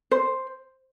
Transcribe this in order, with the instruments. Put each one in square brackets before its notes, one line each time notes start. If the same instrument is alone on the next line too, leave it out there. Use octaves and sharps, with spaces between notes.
[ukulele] C5